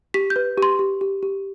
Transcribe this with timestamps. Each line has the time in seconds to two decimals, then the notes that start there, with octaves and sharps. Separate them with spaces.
0.14 G4 B6
0.30 G6
0.36 B4
0.58 G4 C6
0.79 G4
1.01 G4
1.23 G4